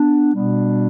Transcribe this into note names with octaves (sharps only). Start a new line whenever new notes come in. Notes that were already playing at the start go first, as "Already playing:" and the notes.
Already playing: B3 D4
B2 G3 B3 D4